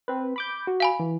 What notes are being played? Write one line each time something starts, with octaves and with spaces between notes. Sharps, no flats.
C4 B4
B5 D6 G6
F#4
F5 G#5 B5
E3